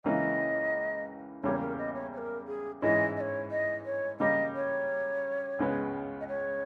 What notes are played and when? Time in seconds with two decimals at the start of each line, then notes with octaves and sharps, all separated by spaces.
0.04 C#2 C#3 E3 A#3 E4 D#5
1.43 E2 C#3 G3 A#3 C#5
1.61 A#4
1.78 D#5
1.95 C#5
2.13 C#5
2.18 A#4
2.47 G#4
2.81 G#2 E3 G#3 C#4 E4 D#5
3.17 D#5
3.21 C#5
3.51 D#5
3.85 C#5
4.20 C#3 G3 A#3 D#5
4.55 C#5
5.59 C#2 C#3 G#3 B3
6.21 D#5
6.28 C#5